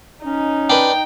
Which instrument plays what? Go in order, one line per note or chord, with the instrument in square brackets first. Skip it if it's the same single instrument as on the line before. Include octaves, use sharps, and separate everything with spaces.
[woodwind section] C#4 [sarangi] D#4
[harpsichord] D4 B4 [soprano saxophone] G5